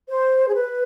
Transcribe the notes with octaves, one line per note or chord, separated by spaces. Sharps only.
C5
G#4
B4